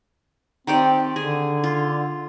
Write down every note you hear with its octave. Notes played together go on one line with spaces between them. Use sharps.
D#3 C4 G4 D5
D3 G#4
F4